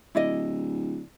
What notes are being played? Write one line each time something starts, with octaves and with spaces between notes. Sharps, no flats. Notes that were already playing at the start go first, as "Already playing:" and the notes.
D1 E4 D5 D#5